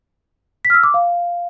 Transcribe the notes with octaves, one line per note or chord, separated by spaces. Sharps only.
B6
F6
E6
D6
F5